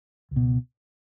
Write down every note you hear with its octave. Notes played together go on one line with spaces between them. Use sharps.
C#2
B2